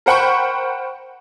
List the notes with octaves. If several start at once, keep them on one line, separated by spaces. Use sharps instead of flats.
A#4 C5 F#5 G5 B5 C#6